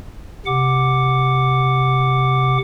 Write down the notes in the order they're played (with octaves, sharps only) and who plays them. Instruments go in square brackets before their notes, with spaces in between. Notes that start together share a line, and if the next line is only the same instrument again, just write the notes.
[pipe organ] C3 F#5 D6